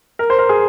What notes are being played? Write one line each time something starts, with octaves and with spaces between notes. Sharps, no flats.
A#4
C5
A#4
G#4